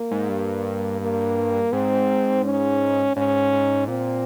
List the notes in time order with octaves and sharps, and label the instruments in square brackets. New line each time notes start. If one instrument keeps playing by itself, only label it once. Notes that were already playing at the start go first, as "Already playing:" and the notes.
Already playing: [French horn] A#3
[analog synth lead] G#2
G2
[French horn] A#3
[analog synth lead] G#2 [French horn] C4
[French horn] C#4
[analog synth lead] G#2 [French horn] C#4
[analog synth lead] G#2
[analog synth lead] A#2 [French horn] C4